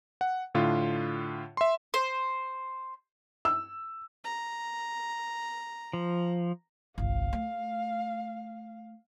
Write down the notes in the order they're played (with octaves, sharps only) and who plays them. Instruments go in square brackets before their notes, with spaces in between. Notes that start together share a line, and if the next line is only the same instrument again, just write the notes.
[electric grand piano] F#5
A2 D3 F4
E5 C6
[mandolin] C5
[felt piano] E6
[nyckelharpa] A#5
[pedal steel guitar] F3
[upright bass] G1 C2 [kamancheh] F5
[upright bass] A3